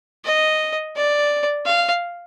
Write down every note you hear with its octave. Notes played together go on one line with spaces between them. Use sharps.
D#5
D5
F5